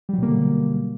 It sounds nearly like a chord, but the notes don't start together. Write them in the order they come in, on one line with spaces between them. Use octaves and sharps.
G3 F#3 B2 A#3 D3